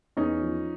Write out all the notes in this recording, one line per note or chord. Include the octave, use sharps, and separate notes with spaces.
E2 C#4 D#4
F3